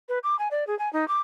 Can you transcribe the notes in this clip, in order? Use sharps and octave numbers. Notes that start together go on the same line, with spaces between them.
B4
D6
G#5
D5
G#4
G#5
D#4
D6